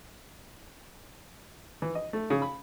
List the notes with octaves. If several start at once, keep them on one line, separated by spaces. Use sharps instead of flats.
E3
D#5
A3
C#3
B5